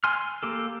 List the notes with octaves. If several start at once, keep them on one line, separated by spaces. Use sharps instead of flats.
G#5 C6 F6
A#3 G4 A4